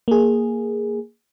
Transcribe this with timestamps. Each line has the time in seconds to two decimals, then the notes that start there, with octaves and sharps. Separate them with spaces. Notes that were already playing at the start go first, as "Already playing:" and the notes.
0.08 A#3 G#4